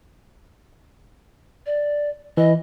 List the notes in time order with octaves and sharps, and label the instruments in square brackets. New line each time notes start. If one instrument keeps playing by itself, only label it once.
[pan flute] D5
[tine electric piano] E3 [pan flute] D#5